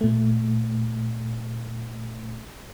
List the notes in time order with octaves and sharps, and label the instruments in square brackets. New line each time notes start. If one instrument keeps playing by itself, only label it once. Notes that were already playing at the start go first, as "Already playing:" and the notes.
[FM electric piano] A#2 A3